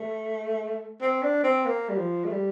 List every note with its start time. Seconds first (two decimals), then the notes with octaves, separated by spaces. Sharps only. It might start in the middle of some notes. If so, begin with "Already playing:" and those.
Already playing: A3
1.01 C4
1.22 D4
1.44 C4
1.65 A#3
1.89 G3
1.97 F3
2.24 A3
2.31 G3